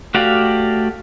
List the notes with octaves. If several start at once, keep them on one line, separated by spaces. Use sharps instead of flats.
A3 F#4 G4 D5 F5